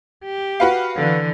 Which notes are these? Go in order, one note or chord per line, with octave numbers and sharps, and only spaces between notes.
G4
F#4 B4 F5
D3 E3